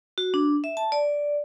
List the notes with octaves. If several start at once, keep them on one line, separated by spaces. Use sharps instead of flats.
F#4
D4
E5
A5
D5